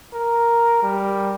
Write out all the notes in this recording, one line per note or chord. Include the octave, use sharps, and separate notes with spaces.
A#4
G3